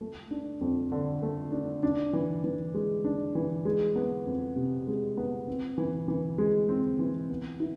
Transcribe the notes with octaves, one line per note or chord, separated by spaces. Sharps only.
A3
D4
F2
D3
A3
D4
D4
E3
E3
G#3
D4
E3
G#3
B3
F2
C3
G#3
B3
C4
E3
E3
G#3
C4
E3
B3
E4